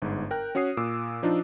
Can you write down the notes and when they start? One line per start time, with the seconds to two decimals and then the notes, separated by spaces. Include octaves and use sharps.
0.02 G1 G#2
0.31 A#4 G5 F#6
0.55 C#4 F#4 C#5 D#6 C7
0.77 A#2 D6 E6
1.23 F3 D4 D#4 F4